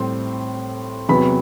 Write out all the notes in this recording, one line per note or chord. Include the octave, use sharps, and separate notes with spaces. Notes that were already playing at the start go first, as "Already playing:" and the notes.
Already playing: A2 G3 C4 C6
E2 C3 F#3 B3 B5